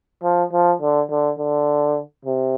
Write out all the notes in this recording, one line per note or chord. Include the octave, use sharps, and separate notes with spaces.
F3
F3
D3
D3
D3
C3